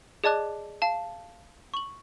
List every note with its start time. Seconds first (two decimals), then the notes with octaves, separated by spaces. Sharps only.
0.24 G#4 D5 D#5 A5 D6 F#6
0.82 F5 A5
1.74 C#6 F#7